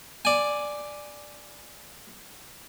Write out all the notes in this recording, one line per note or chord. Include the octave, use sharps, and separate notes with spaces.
D5 G#5